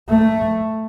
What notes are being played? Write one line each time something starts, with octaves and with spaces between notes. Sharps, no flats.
A3